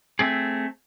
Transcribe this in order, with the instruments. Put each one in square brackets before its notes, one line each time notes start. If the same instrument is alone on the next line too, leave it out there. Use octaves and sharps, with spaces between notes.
[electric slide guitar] A3 C4 G#4